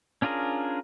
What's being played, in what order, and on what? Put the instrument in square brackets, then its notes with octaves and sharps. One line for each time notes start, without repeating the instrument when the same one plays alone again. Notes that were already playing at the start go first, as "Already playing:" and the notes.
[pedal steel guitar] C#4 D4 F4 G#4 A#4